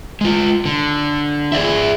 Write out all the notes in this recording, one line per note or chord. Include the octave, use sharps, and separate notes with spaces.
G#3 F4
D3
G#4 C5 D5 E5